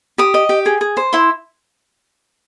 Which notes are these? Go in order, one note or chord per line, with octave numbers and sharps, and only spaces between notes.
G4 D#6
D#5
G4
G#4
G#4
C5
E4 C6